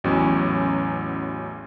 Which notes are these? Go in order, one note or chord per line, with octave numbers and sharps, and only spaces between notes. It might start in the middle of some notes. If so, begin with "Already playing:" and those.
A1 E2 F#3 C#4